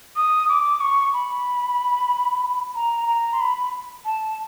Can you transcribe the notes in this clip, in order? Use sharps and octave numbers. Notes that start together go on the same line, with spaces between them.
D#6
D6
C#6
B5
A#5
A#5
C6
B5
A5